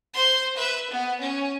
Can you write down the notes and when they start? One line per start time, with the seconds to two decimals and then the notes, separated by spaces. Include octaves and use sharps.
0.14 C5 C6
0.56 B4 E5
0.90 B3
1.20 C#4